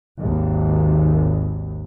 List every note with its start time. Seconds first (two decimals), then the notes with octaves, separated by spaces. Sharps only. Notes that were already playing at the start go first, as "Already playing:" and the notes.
0.19 G#1 D#2